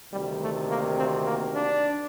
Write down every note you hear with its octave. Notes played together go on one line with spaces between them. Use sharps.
D2 C3 D#3 G3
A3
A#3
C4
A#3
D4